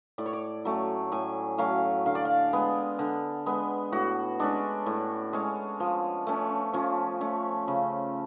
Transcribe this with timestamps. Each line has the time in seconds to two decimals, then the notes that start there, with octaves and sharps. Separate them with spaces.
0.18 A2 D5
0.26 C#5
0.33 D5
0.65 F#3 A3 C#4
1.12 A2 G#5
1.58 F#3 A3 C#4 F5
2.06 D3 F5
2.15 D5
2.25 F5
2.53 G#3 B3
2.99 D3
3.46 G#3 B3
3.92 A2 F#4
4.39 G#3 C#4 D4
4.86 A2
5.33 G#3 C#4
5.80 F3
6.27 A3 C#4
6.73 F3 C#4
7.21 A3 C#4
7.68 C#3